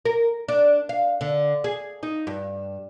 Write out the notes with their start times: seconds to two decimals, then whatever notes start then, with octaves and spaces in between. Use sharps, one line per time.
0.05 A#4
0.48 D4
0.89 F5
1.21 D3
1.64 G#4
2.03 D#4
2.27 G2